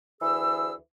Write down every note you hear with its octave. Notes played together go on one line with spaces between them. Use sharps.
D2 E3 G#4 E6